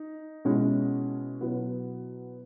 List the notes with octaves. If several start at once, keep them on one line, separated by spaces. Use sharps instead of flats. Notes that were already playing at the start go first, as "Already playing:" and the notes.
Already playing: D#4
B2 G#3 C#4 E4
B2 F#3 B3 E4